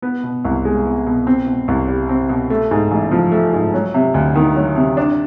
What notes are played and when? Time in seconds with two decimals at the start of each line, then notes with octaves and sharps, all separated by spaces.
0.02 B3
0.23 B2
0.45 C2
0.65 G#3
0.85 B3
1.06 B2
1.27 C4
1.47 B2
1.68 C2
1.88 G3
2.09 C4
2.29 B2
2.50 A3
2.71 G#2
2.91 A1
3.11 F3
3.32 A3
3.53 G#2
3.74 F#3
3.94 C3
4.14 D2
4.35 D#3
4.56 F#3
4.76 C3
4.97 D4